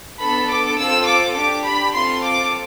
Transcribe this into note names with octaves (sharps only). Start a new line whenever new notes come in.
B3 D4 A4 B5
D6
C4 F4 A4 E6
D6
D4 G4 D6
B5
C4 F4 A4 C6
D6